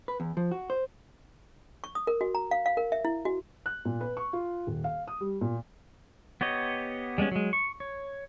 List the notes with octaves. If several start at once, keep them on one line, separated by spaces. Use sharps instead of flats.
B4
E2
F3
F#4
C5
C#6
D#6
A#4
F#4
A#5
F5
F5
A#4
E5
E4
F#4
F#6
A#2
B4
C#6
F4
D#1
F5
D#6
G3
A#2
B3 G4 C#5 D#5
G3 G#3 B3 C#4
F#3 G#3
C#6
C#5